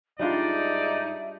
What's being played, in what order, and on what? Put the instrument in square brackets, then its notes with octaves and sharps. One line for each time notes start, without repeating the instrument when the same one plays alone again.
[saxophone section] G#2 D#4 [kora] G3 D4 F4 [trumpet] D5 [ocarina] E5